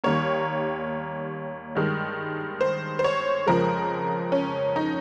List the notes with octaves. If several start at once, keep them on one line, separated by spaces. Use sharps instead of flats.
D#2 D#3 G3 A#3 C#5
G2 D#3 G#3
C5
C5
C#5
F2 C#3 F3 G#3 A#4
C#4
D#4